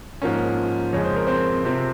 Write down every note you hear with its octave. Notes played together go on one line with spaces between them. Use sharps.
G#2 F3 A#3 C#4
F2 C#3 G#3 C#5
C5
A#4
C4 C5
C3 F3 C4